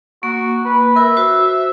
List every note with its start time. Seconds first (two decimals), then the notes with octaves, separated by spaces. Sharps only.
0.23 A#3 F#4
0.65 B4
0.96 A#4 E5
1.17 F#4 C5